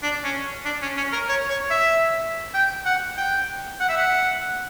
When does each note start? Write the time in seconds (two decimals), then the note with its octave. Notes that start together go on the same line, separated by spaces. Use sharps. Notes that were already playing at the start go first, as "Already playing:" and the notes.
0.03 D4
0.24 C#4
0.65 D4
0.82 C#4
0.97 C#4
1.12 A#4
1.29 C#5
1.50 C#5
1.71 E5
2.54 G5
2.85 F#5
3.17 G5
3.80 F#5
3.89 E5
3.97 F#5